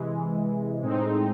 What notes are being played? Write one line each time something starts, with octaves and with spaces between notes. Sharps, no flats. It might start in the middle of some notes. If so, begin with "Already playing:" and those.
Already playing: C3 E3 G#3
A2 G#3 C4 D#4